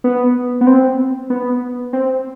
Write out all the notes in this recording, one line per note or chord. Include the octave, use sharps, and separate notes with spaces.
B3
B3
C4
B3
C4